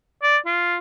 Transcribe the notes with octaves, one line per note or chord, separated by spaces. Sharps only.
D5
F4